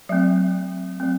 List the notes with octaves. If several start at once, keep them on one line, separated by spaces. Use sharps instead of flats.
F#3 A3 C4 E5
F#3 A3 C4